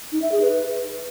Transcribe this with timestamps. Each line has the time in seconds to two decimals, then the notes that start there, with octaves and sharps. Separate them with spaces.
0.12 D#4
0.22 E5
0.32 G#4
0.42 B4